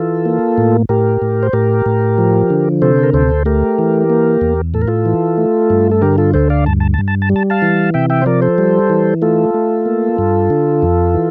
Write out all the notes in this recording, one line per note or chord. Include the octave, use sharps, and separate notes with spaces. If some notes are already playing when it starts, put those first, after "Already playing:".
Already playing: E3 F4 A4
A#3
A2
A2 G4 A#4
A2
C5
A2 G4 A#4
A2
F3
D3
C3 A4 C5
A#4
D2 A4 C5
A3 G4 A#4
E3
A#3
E2
A2 A4
A#4
F4 A4
E3
A3
G2
A4
D3 G4 A#4
F4 A4
D2 A4 C5
D5 F5
G2 A5
A5
A5
G2
A5
A5
G3
A5
F5 A5
E3
C3 E5 G5
E5 G5
C5
F3 A#4 D5
A4 C5
G3
E3
A3 F4 A4
A3
A#3
G2
D3
F2
E3